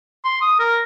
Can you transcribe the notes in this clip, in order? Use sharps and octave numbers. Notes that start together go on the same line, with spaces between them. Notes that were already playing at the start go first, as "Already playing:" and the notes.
C6
D#6
A#4